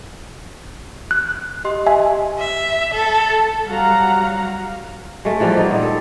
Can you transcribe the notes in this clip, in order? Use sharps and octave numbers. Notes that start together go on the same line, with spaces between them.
F#6
G4 D#5 C6
E5 G#5
E5
A4
F#3 G3 F5 F#5 A#5
G#3 A3
E3 F3 G3 A#3
B3 D#4
A#2
A4